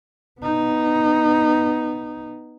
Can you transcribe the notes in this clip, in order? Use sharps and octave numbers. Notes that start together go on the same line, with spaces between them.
B3 D#4